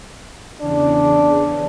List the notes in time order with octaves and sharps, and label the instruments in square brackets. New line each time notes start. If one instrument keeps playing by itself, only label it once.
[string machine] E2 C#3 [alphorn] D4